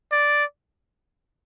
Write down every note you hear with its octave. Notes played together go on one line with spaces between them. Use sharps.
D5